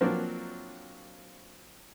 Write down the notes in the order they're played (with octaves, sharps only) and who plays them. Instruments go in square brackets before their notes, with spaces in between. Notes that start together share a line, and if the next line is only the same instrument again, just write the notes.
[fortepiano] F3 F#3 A#3 C4 D4 F#4